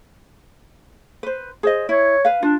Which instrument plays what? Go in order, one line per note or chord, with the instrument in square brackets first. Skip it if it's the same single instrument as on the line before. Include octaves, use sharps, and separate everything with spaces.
[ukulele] B4 C5
G#4 C5 D#5
[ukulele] E4 [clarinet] C#5
[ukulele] B4 F5
[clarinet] D4 [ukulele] F4